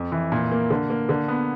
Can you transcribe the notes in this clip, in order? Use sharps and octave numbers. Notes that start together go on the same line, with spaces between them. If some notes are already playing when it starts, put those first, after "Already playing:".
Already playing: F2
E3
A#2
A#3
D3
A#3
D3
B3